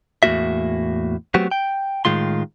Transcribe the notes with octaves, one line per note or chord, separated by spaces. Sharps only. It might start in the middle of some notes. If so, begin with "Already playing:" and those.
E2 A2 A3 A#3 F#4 E5
F#3 A3 B3 C4 F#4 G4
G5
A2 D#3 G#3 F4 C6